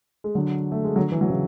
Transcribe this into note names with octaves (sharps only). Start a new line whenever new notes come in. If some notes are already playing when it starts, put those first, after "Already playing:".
G#3
D3 F#3
A3
G#3
D3 F#3
E3
F#3
C#3 E3